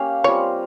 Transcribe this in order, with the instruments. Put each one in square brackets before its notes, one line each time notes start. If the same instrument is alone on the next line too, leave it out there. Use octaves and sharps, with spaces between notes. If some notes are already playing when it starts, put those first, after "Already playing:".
Already playing: [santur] A#3 C#4 G4 F5
[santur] G3 C4 F4 A#4 [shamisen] C#5